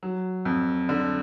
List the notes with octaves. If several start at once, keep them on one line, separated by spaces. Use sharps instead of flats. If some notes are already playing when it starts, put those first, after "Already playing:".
F#3
F2
D3